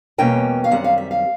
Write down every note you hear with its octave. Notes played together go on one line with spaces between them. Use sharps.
E2 B2 G3 A#3 C#4 G5
F5
F#2 D#3 G3 C4 F#5
F5
E5
F5